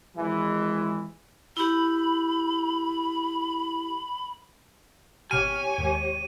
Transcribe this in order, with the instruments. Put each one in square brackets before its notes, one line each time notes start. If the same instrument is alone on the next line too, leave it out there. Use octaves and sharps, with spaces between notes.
[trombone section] G#1 E3 [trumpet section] G#3
[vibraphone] E4 G4 [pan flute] B5
[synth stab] G#1 B2 F6 [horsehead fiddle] G4 C#5 [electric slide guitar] G#5 [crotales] D#7
[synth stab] D#2 G#2